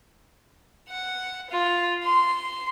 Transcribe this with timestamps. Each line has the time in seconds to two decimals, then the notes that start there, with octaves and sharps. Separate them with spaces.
0.89 F#5
1.50 F4
2.04 C6